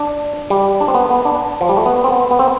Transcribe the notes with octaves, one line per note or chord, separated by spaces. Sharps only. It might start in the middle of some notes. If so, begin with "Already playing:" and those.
Already playing: D4
G3
D4
C4
B3
B3
D4
F3
G3
A3
B3
C4
B3
B3
C4